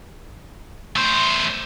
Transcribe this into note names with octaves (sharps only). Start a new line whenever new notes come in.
A3 C5